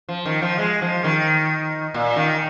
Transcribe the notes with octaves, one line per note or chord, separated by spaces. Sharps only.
F3
D#3
F3
G#3
F3
D#3
A#2
D#3